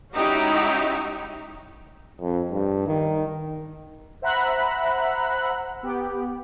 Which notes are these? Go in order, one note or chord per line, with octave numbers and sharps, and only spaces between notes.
G#3 C#4 D#4 E4 F#4 G4
F2
G2
D#3
C5 E5 F#5 A#5 B5 F#6
B3 G4